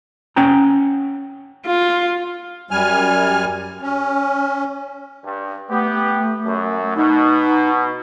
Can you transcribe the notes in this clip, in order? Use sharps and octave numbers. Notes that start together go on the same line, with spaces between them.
C#4 F#5 G5 A#5
F4
F#2 G3 G#5 F6
C#4
G2
A3 B3 G4
F#2
B2 D#4